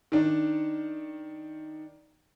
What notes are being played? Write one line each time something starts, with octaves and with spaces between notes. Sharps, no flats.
D#3 D4